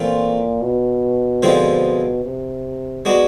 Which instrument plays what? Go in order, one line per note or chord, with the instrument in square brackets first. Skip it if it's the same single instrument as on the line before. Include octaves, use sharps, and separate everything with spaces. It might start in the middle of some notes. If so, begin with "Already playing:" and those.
Already playing: [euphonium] A#2 [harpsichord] E3 A3 C4 F4
[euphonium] B2
[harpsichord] D3 F3 G#3 C4 E4
[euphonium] C3
[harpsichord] G#3 B3 D4 F#4